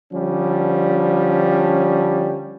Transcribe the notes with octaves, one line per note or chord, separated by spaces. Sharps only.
D3 F3 G3 C#4